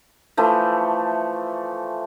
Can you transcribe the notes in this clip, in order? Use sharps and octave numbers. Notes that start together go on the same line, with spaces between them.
E3 F3 A3